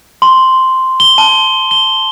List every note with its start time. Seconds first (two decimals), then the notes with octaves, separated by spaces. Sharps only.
0.22 C6
1.00 G7
1.18 A5
1.71 G7